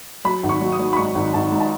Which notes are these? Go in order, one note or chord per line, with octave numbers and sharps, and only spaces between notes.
F#3 B5
G#1
C#6
F#3
D#6
F#3
B5
G#2 C#6
G#1
G#1 A5
G#2
A5